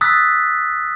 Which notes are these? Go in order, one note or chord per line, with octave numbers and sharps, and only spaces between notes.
D#6 E6 F#6 A6 B6